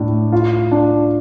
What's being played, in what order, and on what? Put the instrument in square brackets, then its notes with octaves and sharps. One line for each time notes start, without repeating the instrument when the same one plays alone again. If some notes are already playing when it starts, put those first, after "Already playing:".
Already playing: [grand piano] A2 D4
F4
D4